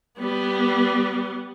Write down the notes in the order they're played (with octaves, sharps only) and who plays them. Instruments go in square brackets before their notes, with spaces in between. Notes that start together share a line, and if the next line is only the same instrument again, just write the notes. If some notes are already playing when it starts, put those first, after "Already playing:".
[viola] G3 B3